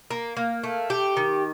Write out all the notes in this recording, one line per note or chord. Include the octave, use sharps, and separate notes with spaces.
A#3
A#3
A3
G4
D#3